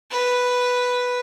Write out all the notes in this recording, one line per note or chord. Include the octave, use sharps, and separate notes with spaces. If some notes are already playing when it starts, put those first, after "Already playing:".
B4